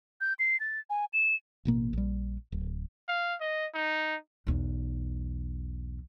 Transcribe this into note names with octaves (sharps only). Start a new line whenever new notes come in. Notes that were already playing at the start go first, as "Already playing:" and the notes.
G6
C7
A6
G#5
E7
A1 B2 A#3
A#1 G3
D1
F5
D#5
D#4
B1 E2